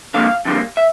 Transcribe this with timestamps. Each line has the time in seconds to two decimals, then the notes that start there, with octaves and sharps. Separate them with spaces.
0.14 F2 D3 G3 A#3 F5
0.45 F2 D3 G3 A#3
0.77 E5